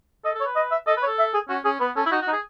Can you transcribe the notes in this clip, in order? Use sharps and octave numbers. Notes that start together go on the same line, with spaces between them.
A4 D#5
A4
C#5
B4
D#5
E5
A4 D#5
B4
C#5
A4
E5
G#4
C#4 F#4
C#4 G#4
B3 B4
C#4 A4
E4
D#4 F#4
F#4
D#4
G#4